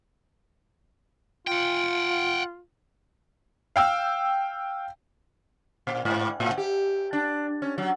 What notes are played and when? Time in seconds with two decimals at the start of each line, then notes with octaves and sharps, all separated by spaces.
1.47 F4 F#5 G5
3.76 F5 G5 E6
5.87 A#2
6.05 G#2
6.40 A2
6.58 G4
7.13 D4
7.62 C#4
7.78 F#3